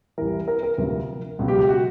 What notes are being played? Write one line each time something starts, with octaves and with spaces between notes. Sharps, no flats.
C2 C3 E3 A#4
A#4
A#4
D2 C3 F3 A#4
C#2 B2 F#3
G4
G4
F#4